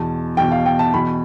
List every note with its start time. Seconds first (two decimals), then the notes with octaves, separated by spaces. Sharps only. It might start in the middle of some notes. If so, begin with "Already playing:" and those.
Already playing: E2 B2 A5
0.37 E2 B2 G5
0.52 F5
0.66 G5
0.79 A5
0.94 E2 B2 B5